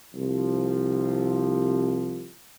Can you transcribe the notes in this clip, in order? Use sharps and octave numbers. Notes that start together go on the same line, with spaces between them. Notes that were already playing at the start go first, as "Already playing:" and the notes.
C2 F3